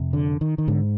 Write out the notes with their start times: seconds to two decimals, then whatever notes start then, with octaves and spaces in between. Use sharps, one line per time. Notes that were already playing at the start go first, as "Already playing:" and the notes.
Already playing: F2 C3
0.13 D3
0.41 D#3
0.58 D#3
0.68 G#2 D3